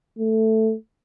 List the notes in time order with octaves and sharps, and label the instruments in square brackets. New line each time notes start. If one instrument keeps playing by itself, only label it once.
[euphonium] A3